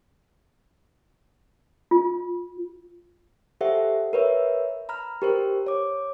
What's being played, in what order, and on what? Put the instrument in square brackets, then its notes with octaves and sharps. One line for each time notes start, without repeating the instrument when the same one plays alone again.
[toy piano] F4
[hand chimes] G4 A4 C5 E5 F#5
A#4 B4 C#5 E5
A#5 B5 F6
G4 A#4 C5
C#5 D6